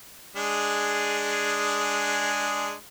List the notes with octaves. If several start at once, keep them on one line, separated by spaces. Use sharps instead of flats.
G#3 D4 G#4